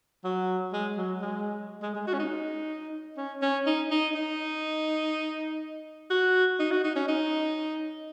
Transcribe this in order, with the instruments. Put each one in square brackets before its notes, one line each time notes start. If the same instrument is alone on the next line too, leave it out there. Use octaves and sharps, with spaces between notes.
[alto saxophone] F#3
G#3
F#3
G#3
G#3
G#3
F#4
C#4
D#4
C#4
C#4
D#4
D#4
D#4
F#4
D#4
F#4
D#4
C#4
D#4